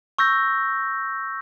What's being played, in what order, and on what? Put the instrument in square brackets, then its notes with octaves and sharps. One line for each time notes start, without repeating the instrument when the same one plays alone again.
[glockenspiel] C#6 E6 G6 A#6